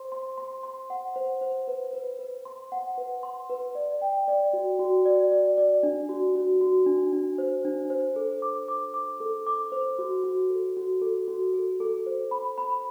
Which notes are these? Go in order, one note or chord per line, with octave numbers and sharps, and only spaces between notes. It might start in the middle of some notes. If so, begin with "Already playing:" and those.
Already playing: C5 C6
C6
C6
C6
F#5
C5
C5
B4
B4
B4
C6
F#5
B4
C6
B4
D5
G5
D5
F#4
F#4
D5
D5
D5
D4
F#4
F#4
F#4
D4
D4
C5
D4
C5
A4
D6
D6
D6
A4
D6
C5
F#4
F#4
A4
F#4
A4
F#4
A4
A4
C5
B5
B5